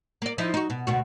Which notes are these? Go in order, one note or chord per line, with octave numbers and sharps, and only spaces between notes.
A#3 D5
F3 D#4 E4
D#4 F#4
B2
D2 B2 F#4